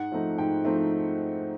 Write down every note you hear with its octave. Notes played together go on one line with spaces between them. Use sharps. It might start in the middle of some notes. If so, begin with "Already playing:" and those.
Already playing: G#2 F#5
F3 A3 C4 D#4
G#2 G5
F3 A3 C4 D#4